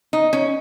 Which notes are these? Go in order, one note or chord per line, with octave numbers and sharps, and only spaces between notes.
D#4
C#4